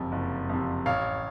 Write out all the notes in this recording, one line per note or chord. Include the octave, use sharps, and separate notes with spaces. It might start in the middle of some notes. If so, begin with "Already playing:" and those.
Already playing: F#1 F2 C3
F#1
F2 C3
A1 C#5 F5